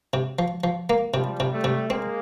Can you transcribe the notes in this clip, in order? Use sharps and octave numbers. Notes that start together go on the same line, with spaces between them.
C3
F3
F3
A#3
C3 F3 G3
C3
G3 A3
C3
G#3 A#3 C4